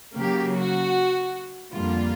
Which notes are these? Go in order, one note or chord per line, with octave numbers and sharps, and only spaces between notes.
C#3 F#3 A#3 G4
F#4
F2 D3 G3 A#3 F4